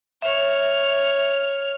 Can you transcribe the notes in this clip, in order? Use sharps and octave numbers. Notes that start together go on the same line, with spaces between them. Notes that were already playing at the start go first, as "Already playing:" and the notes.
C#5 E5 F6